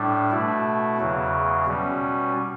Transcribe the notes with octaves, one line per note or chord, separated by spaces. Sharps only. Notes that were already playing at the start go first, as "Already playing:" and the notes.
Already playing: A2 G3 D4
B2 A3 E4
E2 C#3 F#3
B2 G3 C#4